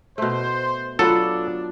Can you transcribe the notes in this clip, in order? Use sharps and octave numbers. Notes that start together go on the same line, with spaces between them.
B2 A3 C5
F#3 B3 D4 F4 A4 F#5